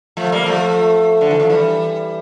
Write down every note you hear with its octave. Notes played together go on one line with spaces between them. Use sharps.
F3 A3
G3 A#3
F3 A3
D3
E3
F3
E3 G3